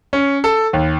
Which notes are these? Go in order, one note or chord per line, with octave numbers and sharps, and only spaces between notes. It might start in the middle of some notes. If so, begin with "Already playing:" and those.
C#4
A4
D#2